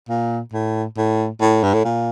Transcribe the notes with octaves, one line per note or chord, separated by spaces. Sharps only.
A#2
A2
A2
A2
G2
A2
A#2